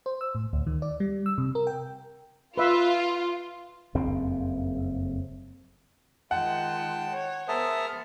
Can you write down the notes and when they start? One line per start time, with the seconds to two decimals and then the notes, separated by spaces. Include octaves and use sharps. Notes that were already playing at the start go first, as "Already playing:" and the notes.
0.06 C5
0.21 E6
0.35 A2
0.53 D2
0.67 D#3
0.82 D5
1.00 G3
1.26 E6
1.38 C3
1.55 A#4
1.67 G5
2.57 F4 B4 E5
3.95 F#1 F2 C#3 C4
6.31 D#3 G#3 F4 F#5 G5 A5
7.10 C#5
7.48 B3 G#4 A#4 C5 E5 A5 D#6 F6